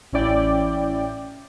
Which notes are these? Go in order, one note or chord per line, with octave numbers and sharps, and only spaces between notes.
A1 C#4 E4 D5 G5